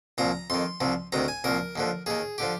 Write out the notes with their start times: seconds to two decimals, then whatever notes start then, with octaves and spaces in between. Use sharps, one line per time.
0.18 C2 A#2 F3 A#5
0.50 F2 D#3 C6
0.81 C2 C3 F3
1.12 D2 C3 D#3 A#5
1.28 G#5
1.44 C2 A#2 F3 A#4
1.76 D#2 D3 F3
2.06 D#2 D#3 G#4
2.38 D3 F3 G4